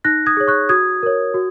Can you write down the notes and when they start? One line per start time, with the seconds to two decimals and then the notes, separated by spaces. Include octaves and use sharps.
0.04 D#4 F#6 A#6
0.26 D#6 G#6
0.37 G#4 C#5
0.48 C#6 F#6
0.69 F#4 D#6 G#6
1.03 A#4 C#5
1.34 F#4